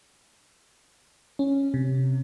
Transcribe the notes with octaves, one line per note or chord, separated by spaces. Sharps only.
C#4
C3